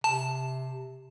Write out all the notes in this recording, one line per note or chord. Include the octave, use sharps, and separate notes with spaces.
C3 A5